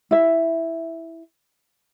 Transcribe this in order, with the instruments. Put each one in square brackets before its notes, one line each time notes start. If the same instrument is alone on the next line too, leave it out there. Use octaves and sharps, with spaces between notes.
[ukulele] E4 E5